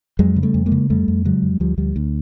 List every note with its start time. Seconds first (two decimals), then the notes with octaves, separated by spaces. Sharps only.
0.19 F2 F#3 G#3
0.36 C#3
0.43 G3 A3
0.54 F2
0.66 G#3 A#3
0.72 C#3
0.90 F2 G3 A3
1.08 F2
1.25 C#3 F#3 G#3
1.43 F2
1.60 D2 F3 G3
1.78 D2 F3 G3
1.96 D2